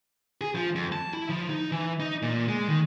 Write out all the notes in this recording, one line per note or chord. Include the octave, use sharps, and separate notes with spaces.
G#4
F3
F2
A5
E4
F3
D#4
E3
D#4
A#2
G#3
D#3